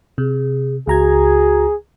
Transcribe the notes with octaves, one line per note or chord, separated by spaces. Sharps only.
C3 G#4
C#2 F#4 G#4 A#5 G#6